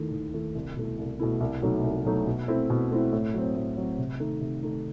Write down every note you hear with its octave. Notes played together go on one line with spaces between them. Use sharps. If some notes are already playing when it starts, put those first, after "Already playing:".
Already playing: D#2 D#3 A3 E4
D#2
D#3 A3 E4
C2
B2 A3 E4
C2
B2 A3 E4
C2
B2 F#3 A3 D#4
C2
B2 F#3 A3 D#4
B2
A3 C4 E4
B2
A3 C4 E4
A2
F#3 C4
A2
F#3 C4
C3
D#3 A3 D#4
C3
D#3 A3 D#4